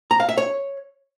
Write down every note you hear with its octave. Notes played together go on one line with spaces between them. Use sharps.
A#5
F5
E5
C#5